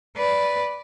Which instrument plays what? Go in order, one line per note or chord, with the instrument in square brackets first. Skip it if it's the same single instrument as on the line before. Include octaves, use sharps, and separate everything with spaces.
[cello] B4 D5